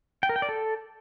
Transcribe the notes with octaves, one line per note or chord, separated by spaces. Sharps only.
G5
A#4
G5
D5
A4